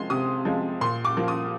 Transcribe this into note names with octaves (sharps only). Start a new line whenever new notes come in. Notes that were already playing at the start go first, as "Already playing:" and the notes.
Already playing: C3 F3 G#3 C6
C3 D#6
F3 G#3
A#2 C6
D6
F3 A#3
D#6